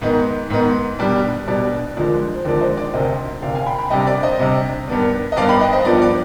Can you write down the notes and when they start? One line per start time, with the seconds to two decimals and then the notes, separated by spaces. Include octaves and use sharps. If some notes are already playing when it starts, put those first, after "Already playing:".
0.02 G#2 D#3 B3 D#4
0.50 G#2 D#3 B3 D#4
0.99 B2 G3 D4
1.47 B2 G3 D4 D5
1.96 D#2 D3 F3 G#3 D4
2.35 C5
2.45 D#2 D3 F3 G#3 D4 D5
2.61 C5 D#5
2.77 D5
2.93 D2 C3 D#3 C5 D#5
3.42 D2 C3 D#3 D5 F5
3.55 F5 G#5
3.66 G5 B5
3.79 G5 B5
3.90 C3 G3 D4 D#5 G5
4.07 D5
4.23 C5 D#5
4.39 C3 G3 D4
4.87 G2 D#3 B3 D4
5.32 D#5
5.36 G2 D#3 B3 D4 D5 F5
5.49 G5 B5
5.61 D#5 G5
5.73 C5 D#5
5.85 G2 F3 B3 D4 D5
6.02 D5